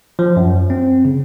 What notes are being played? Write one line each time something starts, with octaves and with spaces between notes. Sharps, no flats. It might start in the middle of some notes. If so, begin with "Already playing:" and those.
F3
F#2
C4
C#3